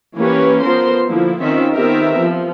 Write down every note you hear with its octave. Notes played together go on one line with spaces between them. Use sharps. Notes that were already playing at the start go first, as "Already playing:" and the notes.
E3 A#3 C#4 G4 B4 C#5
F3 B3 A#4 C5 C6
D3 F3 A#3 E4
D#3 C4 C#4 F4 E5
D#3 B3 C4 G4 A#4 E5
F3